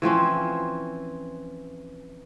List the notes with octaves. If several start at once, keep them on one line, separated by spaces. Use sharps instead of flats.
E3 F3 C4 C#4